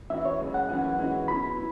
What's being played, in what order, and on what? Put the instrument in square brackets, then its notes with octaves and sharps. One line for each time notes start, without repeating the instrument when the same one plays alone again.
[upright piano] E3 C#4 F#4 [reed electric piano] E5
[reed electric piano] C#5
[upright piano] F#2 C#3 G#3
[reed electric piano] F#5
[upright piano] F#2 E3 C#4 E4 [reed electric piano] F#5
[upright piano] E3 G#3 C#4 F#4
[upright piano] B2 F#3 B3 E4 [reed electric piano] B5
[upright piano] E4